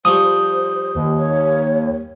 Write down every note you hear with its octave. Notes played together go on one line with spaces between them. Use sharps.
F3 G3 C5 C#6 D#6
D#2
C#5